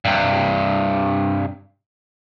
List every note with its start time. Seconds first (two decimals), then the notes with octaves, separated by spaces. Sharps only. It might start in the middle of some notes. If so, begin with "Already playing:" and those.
0.05 G2 C3